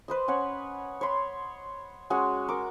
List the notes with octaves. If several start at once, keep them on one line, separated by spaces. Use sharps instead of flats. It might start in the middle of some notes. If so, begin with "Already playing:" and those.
B4 C5 D#5
C#4 C#5 F#5
C#5 B5 C6
G#3 C#4 F#4 F#5
A#4 D6